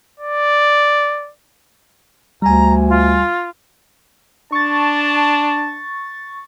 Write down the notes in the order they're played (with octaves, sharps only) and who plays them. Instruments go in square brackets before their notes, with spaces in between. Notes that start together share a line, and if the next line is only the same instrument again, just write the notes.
[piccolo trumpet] D5
[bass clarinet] D2 [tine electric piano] G3 G#5 [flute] A#5
[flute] F4
[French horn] D4 [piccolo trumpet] A5 [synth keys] C#6 A6